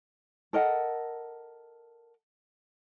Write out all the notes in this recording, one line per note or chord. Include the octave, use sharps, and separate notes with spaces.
A4 A#4 D#5 F#5